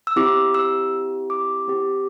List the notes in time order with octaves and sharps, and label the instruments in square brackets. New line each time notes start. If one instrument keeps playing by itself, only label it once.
[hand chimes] E6
C4 E4 G4 D6
E6
D6
C4 G4